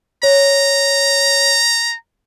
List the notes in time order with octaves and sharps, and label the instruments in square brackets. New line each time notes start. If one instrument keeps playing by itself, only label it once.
[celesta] C#5 [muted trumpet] A#5